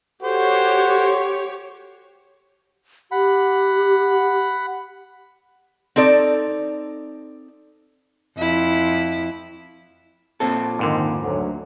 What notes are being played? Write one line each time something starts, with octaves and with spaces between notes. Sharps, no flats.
F#4 G4 A4 C5 C#5
G4 F#5 B5
C4 D#4 A4 D5
F2 E4
A#2 C4 A4
F2 G#2 D3 D#3
D2 F#3